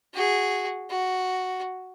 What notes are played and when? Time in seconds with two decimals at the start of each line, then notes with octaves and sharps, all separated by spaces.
0.14 F#4 G#4
0.90 F#4